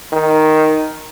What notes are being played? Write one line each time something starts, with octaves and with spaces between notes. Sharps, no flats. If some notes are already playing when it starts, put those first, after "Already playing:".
D#3